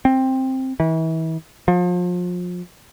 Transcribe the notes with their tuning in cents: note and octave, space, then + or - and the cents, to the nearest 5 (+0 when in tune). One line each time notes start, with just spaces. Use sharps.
C4 +10
E3 -35
F3 +35